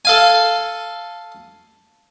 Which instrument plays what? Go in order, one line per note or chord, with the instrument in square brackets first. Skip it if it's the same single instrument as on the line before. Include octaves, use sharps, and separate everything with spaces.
[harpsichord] A4 F5 G#5